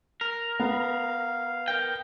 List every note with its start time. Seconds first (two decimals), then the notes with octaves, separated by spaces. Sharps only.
0.21 A#4
0.60 B3 F5
1.68 A#4 G5